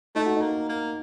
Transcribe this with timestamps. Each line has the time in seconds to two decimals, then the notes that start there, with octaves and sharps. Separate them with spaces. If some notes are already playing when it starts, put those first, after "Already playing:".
0.15 A3 D#4
0.26 F#4
0.36 D#4
0.42 A#3
0.69 A#3